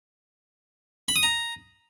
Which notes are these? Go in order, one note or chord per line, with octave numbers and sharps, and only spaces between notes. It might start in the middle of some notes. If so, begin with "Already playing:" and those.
B5
D#6
A#5